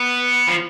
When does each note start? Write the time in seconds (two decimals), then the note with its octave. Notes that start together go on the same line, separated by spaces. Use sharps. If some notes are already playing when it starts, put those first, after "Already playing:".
Already playing: B3
0.47 F3